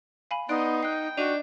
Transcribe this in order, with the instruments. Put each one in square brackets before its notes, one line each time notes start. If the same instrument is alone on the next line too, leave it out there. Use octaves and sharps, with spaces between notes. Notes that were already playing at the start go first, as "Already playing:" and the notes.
[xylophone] F5 G#5 B5
[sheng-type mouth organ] B3 C6 [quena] D#4 [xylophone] D5 F#6 D7
[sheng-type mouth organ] G5 [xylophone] F#6 C7
[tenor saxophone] D4 [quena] F#4 [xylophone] D#5 D#7 F7